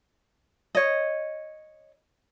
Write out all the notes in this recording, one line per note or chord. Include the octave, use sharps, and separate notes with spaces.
C#5 D#5